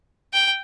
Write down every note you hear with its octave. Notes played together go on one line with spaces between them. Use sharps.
G5